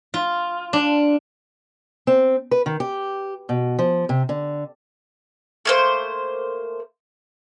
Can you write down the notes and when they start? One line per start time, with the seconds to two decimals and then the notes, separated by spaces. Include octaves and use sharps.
0.14 F4
0.73 D4
2.07 C4
2.51 B4
2.66 D#3
2.80 G4
3.49 B2
3.79 F3
4.09 C3
4.29 D3
5.65 A3 A#3 C5